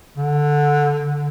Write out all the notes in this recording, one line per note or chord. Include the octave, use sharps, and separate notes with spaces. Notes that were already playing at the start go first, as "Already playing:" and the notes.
D3